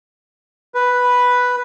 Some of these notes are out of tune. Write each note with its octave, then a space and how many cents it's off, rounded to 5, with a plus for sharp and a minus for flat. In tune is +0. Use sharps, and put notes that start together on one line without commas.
B4 +0